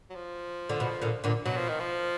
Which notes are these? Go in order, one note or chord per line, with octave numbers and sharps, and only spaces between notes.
F#3
F3
D3
B2
A#2 D3
A#2 D3
B2 F#3
F3
D#3
F3